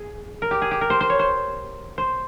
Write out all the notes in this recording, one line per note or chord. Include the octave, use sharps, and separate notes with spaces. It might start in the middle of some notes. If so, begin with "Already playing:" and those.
Already playing: G#4
A#4
G4
G#4
G4
A#4
C5
C5
C#5
C5
C5